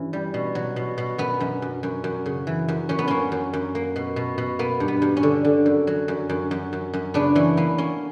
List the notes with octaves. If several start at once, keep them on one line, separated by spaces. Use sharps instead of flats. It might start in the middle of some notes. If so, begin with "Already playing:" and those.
Already playing: G2 E3 C#4
G3
B2
F#3
B2
B2
F#2 B3
F#2
F#2
F#2
F#2
C#3
E3
F#2
F#2 C#4
B3
A#3 C#4
F#2
F#2
A#3
B2
B2
B2
A#3 B3
G2
B3
G2
C#4
D3
D3
F#2
F#3
F#2
F#2
F#2
F#2
F#2
C#3 B3 D4
E3 C#4
A#3 B3
A#3 C#4